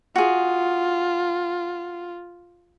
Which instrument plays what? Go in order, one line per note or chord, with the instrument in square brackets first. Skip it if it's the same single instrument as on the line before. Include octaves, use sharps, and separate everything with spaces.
[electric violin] F4 [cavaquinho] F#4 G#4